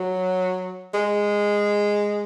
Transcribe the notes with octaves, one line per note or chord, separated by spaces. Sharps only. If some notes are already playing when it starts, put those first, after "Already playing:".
Already playing: F#3
G#3